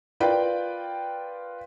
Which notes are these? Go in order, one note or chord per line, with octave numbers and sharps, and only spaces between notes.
F4 A#4 B4 D5 G5